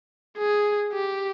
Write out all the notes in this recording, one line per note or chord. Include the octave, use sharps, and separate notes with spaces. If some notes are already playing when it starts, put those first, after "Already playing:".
G#4
G4